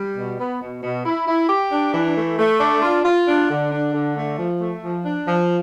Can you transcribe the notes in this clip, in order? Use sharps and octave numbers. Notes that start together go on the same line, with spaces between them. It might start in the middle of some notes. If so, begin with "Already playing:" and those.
Already playing: G3
B2
B3
B2
B2
E4
E4
G4
D4
E3
A3
A3
D4
F4
F4
D4
D3
D4
D3
A3
F3
A3
F3
D4
F3